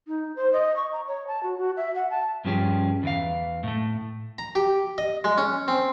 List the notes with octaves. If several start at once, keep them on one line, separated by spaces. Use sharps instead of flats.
D#4
C5
D#5
C#6
A#5
C#5
A5
F#4
F#4
E5
F#5
A5
G2 F3 C#4 G4 G#4
E2 E3 F5
A2 A3
A#5
G4
D#5
G#3
C#4
C4